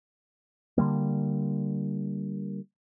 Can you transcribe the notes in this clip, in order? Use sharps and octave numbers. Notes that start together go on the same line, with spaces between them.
D3 F3 G3 A#3